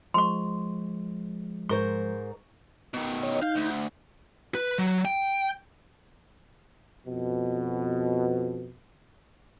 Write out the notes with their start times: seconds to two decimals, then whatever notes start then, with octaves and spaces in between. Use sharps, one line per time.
0.14 F3 G#3 C6 C#6
1.69 G#2 A#4 C5 C#6
2.94 B2 D#3
3.23 C#5 D#5
3.42 D#4 F5 G6
3.55 D2
4.55 B4
4.78 F#3
5.05 G5
7.07 F2 B2